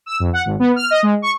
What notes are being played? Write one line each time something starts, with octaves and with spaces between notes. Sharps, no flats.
E6
F2
F#5
G#1
B3
F6
D#5
G#3
C#6